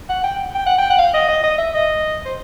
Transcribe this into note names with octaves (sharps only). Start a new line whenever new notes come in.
F#5
G5
G5
F#5
G5
F#5
F5
D#5
D#5
D#5
E5
D#5
C5